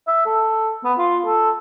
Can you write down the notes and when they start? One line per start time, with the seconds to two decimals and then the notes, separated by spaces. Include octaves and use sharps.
0.07 E5
0.26 A4
0.84 B3
0.98 F4
1.26 A4